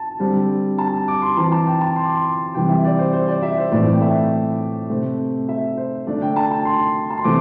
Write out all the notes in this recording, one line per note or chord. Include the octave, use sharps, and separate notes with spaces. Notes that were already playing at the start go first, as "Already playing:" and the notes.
Already playing: A5
D3 G3 C4
A5
D6
C6
E3 C4 A5
A5
G5
A5
C6
D6
C6
C3 E3 G3 G5
E5
D5
C5
C5
D5
E5
C5
A2 E3 A3 C4 D5
G5
E5
C3 A3 C4
E5
C5
D3 A3 D4 D5
G5
A5
A5
C6
A5
C6
C3 E3 A3 C4 D6